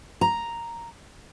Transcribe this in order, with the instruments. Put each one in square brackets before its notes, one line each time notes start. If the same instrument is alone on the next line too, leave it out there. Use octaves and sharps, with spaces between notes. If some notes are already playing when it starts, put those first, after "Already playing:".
[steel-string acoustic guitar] A#5